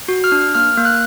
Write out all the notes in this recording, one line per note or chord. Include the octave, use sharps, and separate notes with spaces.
F#4
F6
D4
A#3 F6
A#3
F#6